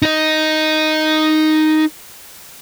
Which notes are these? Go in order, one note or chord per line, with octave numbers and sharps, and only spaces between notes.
D#4 D#5